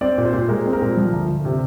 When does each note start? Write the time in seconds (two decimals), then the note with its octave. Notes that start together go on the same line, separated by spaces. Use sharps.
0.01 C4 D5
0.18 A#2
0.25 C5
0.34 A#2
0.49 G#3 A#4
0.66 C4
0.73 A#4
0.82 A#2
0.97 F3
1.12 D2
1.29 D2
1.45 C3